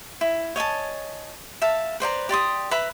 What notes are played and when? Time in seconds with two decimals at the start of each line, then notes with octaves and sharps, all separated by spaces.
0.21 E4
0.56 C#5 D#5 G#5 A5
1.62 E5 F5 A5
2.00 B4 C5 D5 A#5
2.29 G4 D5 C6 D#6
2.71 B4 E5 A#5 B5